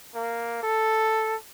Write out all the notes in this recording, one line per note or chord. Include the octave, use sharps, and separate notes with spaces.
A#3
A4